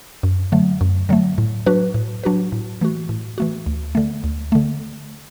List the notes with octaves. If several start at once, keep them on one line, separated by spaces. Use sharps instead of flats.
F#2
D3 F#3 A3
F#2
D3 F#3 A3
A2
F#3 D4 F#4 B4
A2
F#3 D4 F#4 B4
A2
E3 A3 F#4
A2
E3 A3 F#4
D2
D3 A3
D2
D3 A3